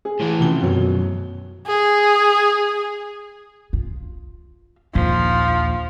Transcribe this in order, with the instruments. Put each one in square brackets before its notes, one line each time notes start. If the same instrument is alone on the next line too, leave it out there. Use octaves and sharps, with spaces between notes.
[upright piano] G#4
[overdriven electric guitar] A2 E3
[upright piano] F1 C#3 G7
[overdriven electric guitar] B1 F#2 [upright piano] B2 F#3
[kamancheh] G#4
[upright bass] F4
[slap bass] A#1 [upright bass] D#2 [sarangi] F3